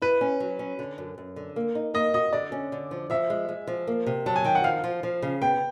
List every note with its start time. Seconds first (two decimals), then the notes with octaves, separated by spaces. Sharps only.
0.02 E4 B4
0.21 C#4
0.40 F#3
0.59 C#4
0.79 D3
0.98 F#2
1.18 F#2
1.36 D3
1.56 A#3
1.75 D#4
1.94 A#3 D#5
2.14 F#4 D#5
2.33 D3 D5
2.52 C#4
2.72 D3
2.91 F3
3.10 F3 E5
3.30 G#3
3.49 G#3
3.67 F3
3.87 A#3
4.07 C3
4.26 F#3 A5
4.36 G#5
4.45 D#3 G5
4.55 F#5
4.64 F3 F5
4.84 F3
5.03 F3
5.22 C#3
5.42 B3 G5